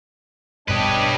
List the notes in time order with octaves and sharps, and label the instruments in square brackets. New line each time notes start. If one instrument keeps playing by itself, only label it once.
[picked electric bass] G1 G2 B2 [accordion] D4 C#5 D#5 [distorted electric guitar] G4 B4